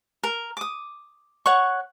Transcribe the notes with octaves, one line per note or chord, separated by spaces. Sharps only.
A#4
D6 D#6
C#5 F#5 C#6